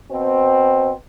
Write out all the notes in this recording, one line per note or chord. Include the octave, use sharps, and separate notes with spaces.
B2 C4